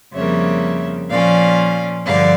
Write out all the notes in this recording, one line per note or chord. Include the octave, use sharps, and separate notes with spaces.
F2 C#3 G3 A#3 C#5 E5
A#2 F3 C#4 D5 F5
G2 D3 F3 D5 F5